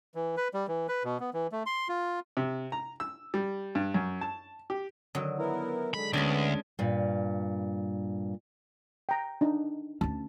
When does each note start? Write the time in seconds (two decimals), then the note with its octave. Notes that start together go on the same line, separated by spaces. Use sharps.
0.15 E3
0.37 B4
0.54 G3
0.68 E3
0.89 B4
1.04 B2
1.20 B3
1.34 E3
1.52 A3
1.66 C6
1.89 F4
2.37 C3
2.72 A#5
3.00 E6
3.34 G3
3.75 G2
3.94 F#2
4.21 A5
4.70 G4
5.15 D3 D#3 F#3
5.38 B3 E4 A#4
5.94 D3 G#3 B5
6.13 D2 G#3 B3 C#4 D4 G5 C6
6.79 G2 A#2
9.09 G5 A#5
9.41 D4 D#4
10.01 D2 C#4 A5